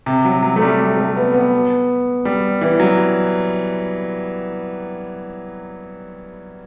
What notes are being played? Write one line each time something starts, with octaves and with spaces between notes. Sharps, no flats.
C3
F#3
F#3
A3
G3
G3
A3
B3
B3
G3
E3
F#3